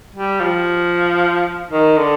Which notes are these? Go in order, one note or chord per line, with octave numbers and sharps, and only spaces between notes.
G3
F3
D#3
D3